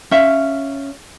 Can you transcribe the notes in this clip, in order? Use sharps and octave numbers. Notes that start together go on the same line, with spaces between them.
C#4 E5 F5